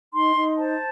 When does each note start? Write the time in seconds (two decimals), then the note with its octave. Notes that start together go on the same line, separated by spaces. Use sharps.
0.12 D#4 C6
0.35 D#4
0.57 C5 A5